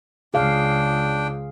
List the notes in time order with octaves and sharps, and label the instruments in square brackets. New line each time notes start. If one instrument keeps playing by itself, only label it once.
[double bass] C#2 [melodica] D4 G5 [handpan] G#4 F5